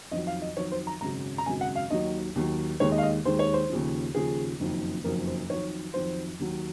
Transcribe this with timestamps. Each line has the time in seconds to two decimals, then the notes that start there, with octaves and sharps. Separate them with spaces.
0.11 F2 D#3 F#3 D#5
0.27 F5
0.42 D#5
0.56 F2 D#3 F#3 C#5
0.72 C5
0.87 A#5
1.01 G#1 F#2 C#3 F#3 A#5
1.38 A#5
1.46 G#1 F#2 C#3 F#3 G#5
1.61 F#5
1.75 F5
1.90 D#2 D#3 F#3 D#5
2.35 D#2 D#3 F#3
2.80 D#2 D#3 G#3 C#5
2.92 D#5
2.98 F5
3.03 D#5
3.25 D#2 D#3 G#3 C5
3.39 C#5
3.54 C5
3.70 D#2 C#3 F3
4.15 D#2 C#3 F3 G#4
4.60 F#1 F2 D#3 F#3
5.04 F#1 F2 D#3 F#3 A#4
5.27 C5
5.49 F2 D#3 F#3 C#5
5.94 F2 D#3 F#3 C5
6.39 D#2 D#3 F#3